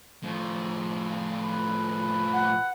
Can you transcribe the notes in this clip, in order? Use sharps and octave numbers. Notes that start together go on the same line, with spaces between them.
A2 F3
B4
F#5